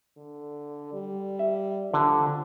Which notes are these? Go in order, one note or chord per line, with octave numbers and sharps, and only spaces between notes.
D3
G3
E5
D3 F3